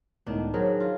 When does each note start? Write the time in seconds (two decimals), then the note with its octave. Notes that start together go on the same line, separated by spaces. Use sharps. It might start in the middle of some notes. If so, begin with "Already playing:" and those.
0.27 C#2 A2 D#3 B3 D4
0.54 F#3 G#4 A#4 C5
0.80 F4